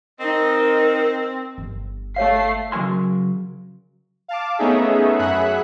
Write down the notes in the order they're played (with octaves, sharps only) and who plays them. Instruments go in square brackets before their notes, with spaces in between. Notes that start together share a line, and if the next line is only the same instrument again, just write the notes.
[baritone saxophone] C4 [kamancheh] D#4 D#5 [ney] A#4
[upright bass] G1
[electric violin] A3 C7 [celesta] C#5 F5
[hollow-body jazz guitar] C#3 F#3 A#4 G#5 C6
[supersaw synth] F5 A5 D6
A3 B3 C#4 D#4 G#4 E5
F#2 G#4 E5 F#5 B5 F#6